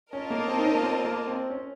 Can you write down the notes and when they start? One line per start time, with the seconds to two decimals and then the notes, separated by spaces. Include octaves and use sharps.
0.13 C#4 F4 A#4 D#5 A5
0.30 A#3
0.48 C4
0.59 D#4
0.65 C#4
0.75 A#3
0.82 C4
1.05 A#3
1.27 C4
1.50 C#4